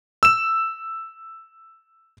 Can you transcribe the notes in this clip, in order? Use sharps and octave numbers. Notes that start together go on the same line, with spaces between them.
E6 E7